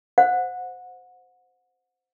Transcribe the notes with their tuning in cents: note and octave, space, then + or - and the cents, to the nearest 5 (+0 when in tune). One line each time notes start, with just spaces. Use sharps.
C5 -15 F#5 -25